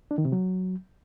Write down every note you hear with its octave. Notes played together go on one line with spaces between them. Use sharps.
D4
D#3
C3
F#3